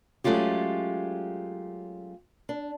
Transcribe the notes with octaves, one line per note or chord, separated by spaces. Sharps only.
F#3 G#3 A3 C#4 F4 G4
D4